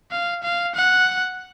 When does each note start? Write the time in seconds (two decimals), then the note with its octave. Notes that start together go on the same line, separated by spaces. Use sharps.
0.11 F5
0.43 F5
0.75 F#5